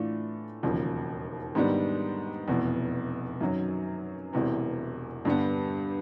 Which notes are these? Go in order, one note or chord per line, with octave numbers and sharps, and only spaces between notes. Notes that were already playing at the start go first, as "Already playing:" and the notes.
Already playing: A2 E3 A3 D4 F4
E1 D#2 C#3 F3
G#2 D#3 G3 B3 D4
F1 E2 B2
F#2 D#3 F#3
E1 E2 C3 E3
G2 D3 G3 B3